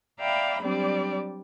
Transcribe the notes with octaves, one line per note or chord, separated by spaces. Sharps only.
D5 E5 F5 G5 A#5 B5
F#3 G3 C4 D4 D5